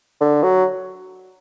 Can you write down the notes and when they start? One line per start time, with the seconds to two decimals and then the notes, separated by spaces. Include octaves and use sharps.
0.21 D3
0.43 F#3